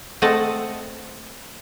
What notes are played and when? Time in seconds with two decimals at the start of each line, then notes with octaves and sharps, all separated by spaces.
0.22 A3 C4 A4 D#5 F#5 A5